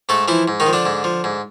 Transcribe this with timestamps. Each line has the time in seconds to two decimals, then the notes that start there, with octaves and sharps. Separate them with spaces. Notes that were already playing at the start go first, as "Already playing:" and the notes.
0.09 G#2 A3 A4
0.28 E3 F3 E4
0.48 G#2
0.60 D#3 D#4
0.67 F3
0.73 D3 D4
0.86 G#2
1.04 F3
1.24 G#2